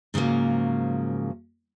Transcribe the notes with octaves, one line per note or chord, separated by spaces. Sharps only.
G#2 C#3 F3 F#3 A#3